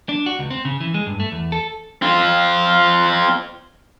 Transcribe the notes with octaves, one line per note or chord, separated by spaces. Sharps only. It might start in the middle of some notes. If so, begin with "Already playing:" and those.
D4
F#4
C#2
C4
C#3
E3
G#3
G2
A3
E2
A4
C4 F4